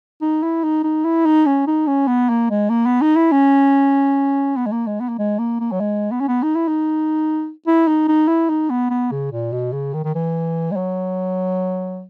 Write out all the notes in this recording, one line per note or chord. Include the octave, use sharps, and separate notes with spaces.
D#4
E4
D#4
D#4
E4
D#4
C#4
D#4
C#4
B3
A#3
G#3
A#3
B3
D#4
E4
C#4
B3
G#3
A#3
G#3
B3
A#3
G#3
A#3
A#3
F#3
G#3
B3
C#4
B3
D#4
E4
D#4
E4
D#4
D#4
E4
D#4
B3
B3
C#3
A#2
B2
C#3
D#3
D#3
E3
G#3
F#3